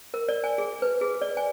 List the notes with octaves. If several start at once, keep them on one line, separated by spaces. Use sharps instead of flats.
A#4
D5
G#5
G#4
B4
G#4
D5
G#5